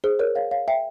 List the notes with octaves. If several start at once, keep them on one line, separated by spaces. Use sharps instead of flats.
G#4 C5
A#4 C#5
C#5 F5
C#5 F5
E5 G5